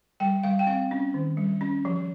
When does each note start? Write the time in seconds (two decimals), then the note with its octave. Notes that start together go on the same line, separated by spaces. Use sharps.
0.20 G3 G5
0.43 G3 F5
0.59 G5
0.67 C4 F5
0.91 C#4
1.14 D#3
1.37 G3
1.61 C#4
1.85 F3